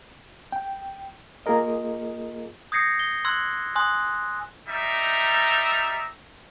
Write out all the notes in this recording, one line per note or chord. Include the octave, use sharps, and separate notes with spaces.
G5
A#3 F4 G#4 A#4 D#5
D#6 G6 G#6 A#6 C7 C#7
G7
C6 E6 F#6 G#6
G#5 C6 D#6 F#6
G3 D#4 E5 A#5